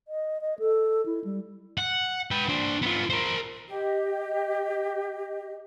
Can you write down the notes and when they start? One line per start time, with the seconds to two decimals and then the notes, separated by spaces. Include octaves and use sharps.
0.08 D#5
0.41 D#5
0.59 A4
1.06 E4
1.24 G3
1.78 F#5
2.31 B4 G5
2.49 D4 C5
2.82 B3 F4
3.10 A#4 C5
3.69 G4 D#5